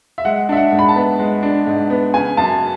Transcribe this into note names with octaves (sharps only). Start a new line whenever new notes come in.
E5
G#3 F#5
D4 E5
F#5
G#2
B5
A5
B3
G#3
D4
G#2
B3
C#3 G#5
F#2 A5